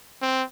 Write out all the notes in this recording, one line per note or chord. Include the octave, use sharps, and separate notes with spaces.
C4